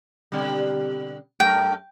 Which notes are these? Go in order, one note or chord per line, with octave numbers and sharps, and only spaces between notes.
B2 D3 G3
F#2 A3 A#4 G5